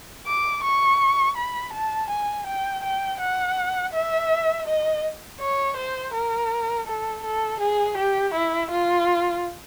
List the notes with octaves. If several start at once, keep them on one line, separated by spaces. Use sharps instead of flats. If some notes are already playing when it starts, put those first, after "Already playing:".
D6
C#6
B5
A5
G#5
G5
G5
F#5
E5
D#5
C#5
C5
A#4
A4
A4
G#4
G4
E4
F4